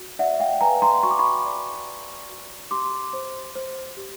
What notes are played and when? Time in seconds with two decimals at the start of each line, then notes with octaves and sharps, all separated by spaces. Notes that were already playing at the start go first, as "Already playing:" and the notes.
Already playing: F#4
0.19 D5 E5 F#5
0.40 F5 G5
0.61 B4 G#5 A#5
0.82 A#5 C6
1.03 F#4 C#6
1.11 D6
1.19 B5 C#6
1.46 D5
1.87 D5
2.29 F#4
2.71 G4 C6 D6
3.13 C5
3.55 C5
3.97 G4